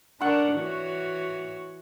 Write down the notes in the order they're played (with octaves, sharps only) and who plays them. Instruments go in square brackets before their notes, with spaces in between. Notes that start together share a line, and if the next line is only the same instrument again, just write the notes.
[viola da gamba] D4 A#4 [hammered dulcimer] F#5 C#6
[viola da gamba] E3 F#4 C#5